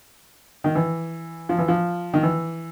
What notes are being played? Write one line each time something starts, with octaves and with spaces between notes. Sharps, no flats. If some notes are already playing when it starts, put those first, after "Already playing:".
D#3
E3
F3
E3
F3
D#3
E3